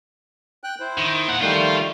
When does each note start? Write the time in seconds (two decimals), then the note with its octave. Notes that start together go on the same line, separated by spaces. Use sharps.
0.64 G5 F#6
0.80 E4 C5
0.98 D#3
1.28 A#2 F#5
1.41 D#3 G3 A3 F4 C5